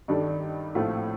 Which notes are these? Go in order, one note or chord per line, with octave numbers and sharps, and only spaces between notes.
G2 D#3 G3 D4 A4
A#1 A2 A3 C4 F4